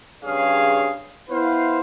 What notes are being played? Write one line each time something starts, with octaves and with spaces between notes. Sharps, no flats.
G2 C#3 G#4 C#5 F5
B3 E4 B4 C5 F5